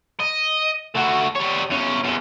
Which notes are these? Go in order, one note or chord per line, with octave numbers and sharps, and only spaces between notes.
D#5
A3 F#4
G3 C#5
E2 C#4
E2 C#4